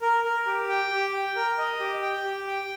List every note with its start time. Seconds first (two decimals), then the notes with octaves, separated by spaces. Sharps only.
0.01 A#4
0.24 A#4
0.47 G4
0.69 G5
0.91 G4
1.13 G5
1.36 A#4
1.58 D#5
1.80 G4
2.02 G5
2.25 G4
2.47 G5